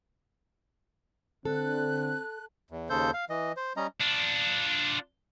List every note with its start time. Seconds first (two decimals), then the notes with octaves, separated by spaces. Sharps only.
1.45 D3 C4 A4 F#6
2.71 E2
2.90 D#2 C#3 A4 C5 G6
3.14 F5
3.30 E3 D#5
3.57 C5
3.77 G3 C#4 D#5 A#5
4.00 D4 F4